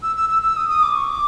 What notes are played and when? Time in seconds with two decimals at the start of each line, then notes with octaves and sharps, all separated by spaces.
0.03 E6
0.17 E6
0.29 E6
0.42 E6
0.57 D#6
0.69 D#6
0.83 D6
0.95 C#6
1.09 D6